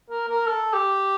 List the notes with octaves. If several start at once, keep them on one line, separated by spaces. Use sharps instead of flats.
A#4
A#4
A4
G4